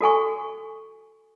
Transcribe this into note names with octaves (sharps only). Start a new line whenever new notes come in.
F#4 A4 G#5 C#6